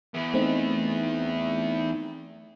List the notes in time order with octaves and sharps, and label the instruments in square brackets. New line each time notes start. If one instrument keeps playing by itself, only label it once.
[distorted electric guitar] E2
[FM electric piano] A3 C4 D#4